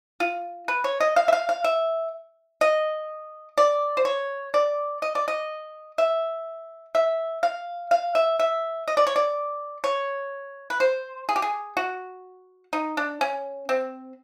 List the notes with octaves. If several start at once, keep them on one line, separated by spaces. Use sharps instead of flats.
F4
B4
C#5
D#5
F5
E5
F5
F5
E5
D#5
D5
C5
C#5
D5
D#5
D5
D#5
E5
E5
F5
F5
E5
E5
D#5
D5
C#5
D5
C#5
B4
C5
G#4
G4
G#4
F#4
D#4
D4
C#4
C4